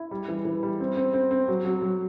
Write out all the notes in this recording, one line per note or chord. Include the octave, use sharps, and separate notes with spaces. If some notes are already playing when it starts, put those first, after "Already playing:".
Already playing: E4
G3
E3
E3
G3
C4
C4
C4
C4
F#3
F#3
F#3